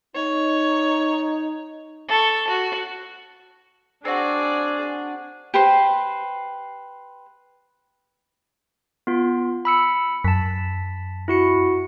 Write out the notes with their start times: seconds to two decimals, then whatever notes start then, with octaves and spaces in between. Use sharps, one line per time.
0.15 D#4 C#5
2.09 A4 C#6
2.48 F#4
4.05 C4 D4 F#4 G#4 D5
5.54 G4 B4 C5
9.07 B3 F4
9.65 B5 E6 C#7
10.24 F#2 A5 B6
11.28 E4 F#4 C#7